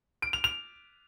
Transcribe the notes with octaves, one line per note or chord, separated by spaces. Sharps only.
D7
F7
F7